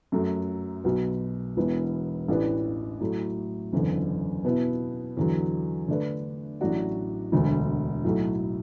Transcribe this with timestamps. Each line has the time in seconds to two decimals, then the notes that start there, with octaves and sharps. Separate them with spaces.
0.12 F#2 F#3 A3
0.84 B1 B2 B3 F#4
1.57 E1 E2 E3 B3
2.28 A1 A2 E3 D4 B4
3.00 A2 F#3 A3
3.73 F#1 E2 D3
4.44 B2 B3 E4
5.17 E2 D3 F#3
5.88 D3 A3 D4 B4
6.61 A1 A2 F#3 D4 F#4
7.32 E1 D2 D3
8.04 B1 A2 F#3 A3 F#4